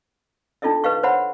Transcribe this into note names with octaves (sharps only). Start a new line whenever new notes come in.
D4 D#4 F4 A4 D#5 E5
B4 D#5 F5 C#6
C5 C#5 E5 F#5 B5 C6